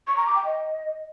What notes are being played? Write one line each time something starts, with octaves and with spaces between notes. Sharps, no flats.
C#6
A#5
D6
G5
D#5